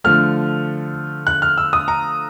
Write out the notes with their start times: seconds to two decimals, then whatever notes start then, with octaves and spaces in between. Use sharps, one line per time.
0.04 D3 F3 A3 F6
1.27 F#6
1.42 F6
1.58 E6
1.73 D#6
1.88 A#5